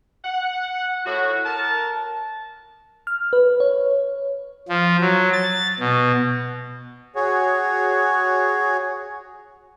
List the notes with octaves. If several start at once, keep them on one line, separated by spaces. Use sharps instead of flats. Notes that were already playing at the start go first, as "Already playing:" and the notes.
F#5
A2 F#4
A#4 A5
F6
B4
C#5
F3
F#3
A6
B2
F#4 G#4 C#5